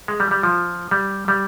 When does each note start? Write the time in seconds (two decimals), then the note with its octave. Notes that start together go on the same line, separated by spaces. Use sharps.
0.08 G#3
0.20 G3
0.31 G3
0.43 F3
0.91 G3
1.28 G3